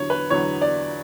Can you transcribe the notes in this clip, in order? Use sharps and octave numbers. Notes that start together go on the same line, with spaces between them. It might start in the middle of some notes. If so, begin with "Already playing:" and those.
Already playing: E2 D3 F#3 C#5
B4
E2 D3 F#3 C#5
D5